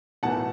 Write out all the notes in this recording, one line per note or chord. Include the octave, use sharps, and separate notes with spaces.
B1 A2 E3 A3 F#5 A5